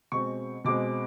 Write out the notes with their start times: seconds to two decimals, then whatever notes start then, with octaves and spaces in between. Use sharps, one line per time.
0.12 B2 G#3 C4 C#6
0.65 B2 G#3 C4 D6